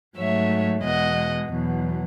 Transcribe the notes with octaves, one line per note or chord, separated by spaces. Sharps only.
G#2 F#3 A3 C#5 E5
E2 B2 G#3 D#5 F#5
E2 B2 F#3